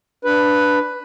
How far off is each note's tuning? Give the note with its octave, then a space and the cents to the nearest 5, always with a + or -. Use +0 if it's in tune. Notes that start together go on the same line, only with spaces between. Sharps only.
D4 +0 B4 +5